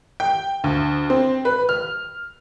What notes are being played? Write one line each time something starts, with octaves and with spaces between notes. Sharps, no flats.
G5
D2
C4
B4
F6